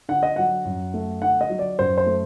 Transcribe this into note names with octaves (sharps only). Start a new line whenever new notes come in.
D3 F#5
D#5
F#3 F#5
F#2
A3
D3 F#5
D#5
F#3
D5
F#2 C5
C5
A3